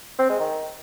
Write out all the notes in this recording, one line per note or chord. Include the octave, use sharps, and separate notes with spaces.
C4
G#3
D#3